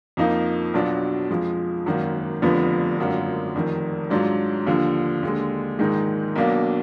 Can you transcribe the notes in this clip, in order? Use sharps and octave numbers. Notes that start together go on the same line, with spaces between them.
F2 F3 A#3 D#4
B1 B2 F#3 D4 F4
F2 F3 G#3
G#1 F#2 D#3 A#3
F1 F2 D3 F3 B3
G#1 F#2 D3 F3 A#3
F1 F2 D#3
G#2 F#3 D4 F4
D#2 D3 F3
D#2 D3 G#3
A#1 G#2 D#3 G#3 D#4
B1 B2 A#3 D4